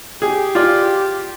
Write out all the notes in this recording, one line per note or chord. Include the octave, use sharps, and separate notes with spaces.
G4 G#4
F4 D5